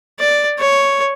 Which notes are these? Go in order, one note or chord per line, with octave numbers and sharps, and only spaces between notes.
D5
C#5